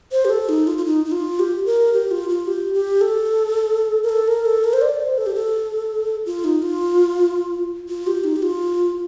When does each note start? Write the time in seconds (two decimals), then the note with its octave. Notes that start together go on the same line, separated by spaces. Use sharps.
0.12 C5
0.25 G4
0.30 A4
0.49 D#4
0.67 F4
0.78 F4
0.85 D#4
1.05 D#4
1.12 F4
1.39 G4
1.66 A#4
1.93 G4
2.11 F4
2.29 F4
2.47 G4
2.74 G4
3.01 A4
4.03 A#4
4.09 A4
4.28 A#4
4.45 A4
4.64 A#4
4.73 C5
4.82 D5
5.00 C5
5.18 A4
5.27 G4
5.35 A4
6.26 F4
6.44 D#4
6.62 F4
7.89 F4
8.07 G4
8.24 D#4
8.36 G4
8.43 F4